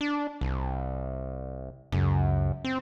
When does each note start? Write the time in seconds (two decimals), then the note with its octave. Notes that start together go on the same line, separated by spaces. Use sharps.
0.01 D4
0.41 C2
1.92 C#2 F#2
2.64 C4